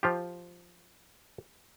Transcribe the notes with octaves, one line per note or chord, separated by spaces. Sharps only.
F3 F4 G4